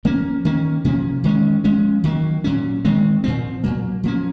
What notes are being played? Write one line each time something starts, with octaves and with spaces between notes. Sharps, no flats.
F3 A#3 C#4
D#3 A#3 C#4
C3 F3 A#3 C#4
D#3 G#3 C#4
F3 G#3 C#4
D#3 F#3 A#3
A#2 F#3 C#4
D#3 G#3 C4
A#2 F3 C4
A#2 F#3 A#3
F3 A#3 C#4